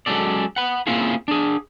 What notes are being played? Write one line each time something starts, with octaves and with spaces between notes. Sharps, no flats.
F#3 G#3 C#4 A4 D5
F#5 B5
A#3 C4 C#4 E4 F4 G#4
D4 G#4